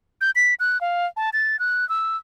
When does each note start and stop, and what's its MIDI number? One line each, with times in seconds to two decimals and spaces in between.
0.21 0.31 91
0.36 0.54 95
0.60 0.80 90
0.81 1.06 77
1.17 1.30 81
1.33 1.59 93
1.59 1.87 90
1.89 2.17 88